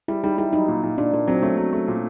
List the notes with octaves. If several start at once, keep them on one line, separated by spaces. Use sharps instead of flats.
G3 E4
G3 D#4
G3 E4
F#3 D#4
A#2
A#2
A#2 D4
A#2 A#3
F#3 C4
A3 C#4
F#3
A3
A#2